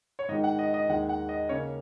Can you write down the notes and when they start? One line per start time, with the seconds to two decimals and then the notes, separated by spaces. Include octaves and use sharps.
0.19 C#5
0.29 G#2 D#3 G#3 D#5
0.44 F#5
0.59 D#5
0.74 D#5
0.88 D#2 D#3 G#3 F#5
1.09 F#5
1.29 D#5
1.49 C#3 A#3 C#4 C#5